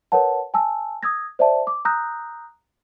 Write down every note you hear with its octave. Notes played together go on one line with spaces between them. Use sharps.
A#4 B4 C#5 F#5 A5
G#5 A5 E6
D#6 E6 G#6 A#6
C5 D5 E5 A5
D6
A#5 D#6 E6 F#6 G6 A#6